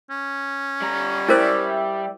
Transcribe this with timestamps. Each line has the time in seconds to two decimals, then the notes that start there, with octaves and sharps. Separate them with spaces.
0.10 C#4
0.82 G3 A#5
1.28 E4 A#4 C5 D5 E5 G5